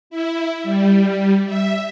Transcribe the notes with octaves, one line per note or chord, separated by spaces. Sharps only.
E4
G3
E5